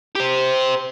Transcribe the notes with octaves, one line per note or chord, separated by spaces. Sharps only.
G4 C5